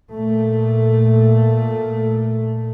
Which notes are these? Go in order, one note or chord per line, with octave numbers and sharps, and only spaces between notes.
A#2 A3